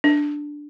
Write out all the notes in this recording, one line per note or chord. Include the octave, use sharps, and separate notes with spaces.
D4